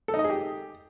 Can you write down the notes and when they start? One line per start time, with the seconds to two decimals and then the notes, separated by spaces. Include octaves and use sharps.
0.08 A4
0.14 D#4
0.19 D#5
0.24 G#4
0.30 G4